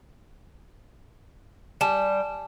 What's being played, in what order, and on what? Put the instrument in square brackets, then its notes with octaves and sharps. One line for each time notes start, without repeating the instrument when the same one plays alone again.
[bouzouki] G3 [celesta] G#5 A5 E7